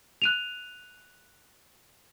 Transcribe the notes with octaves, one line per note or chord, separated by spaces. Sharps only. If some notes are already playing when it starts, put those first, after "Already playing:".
F#6 D#7 F7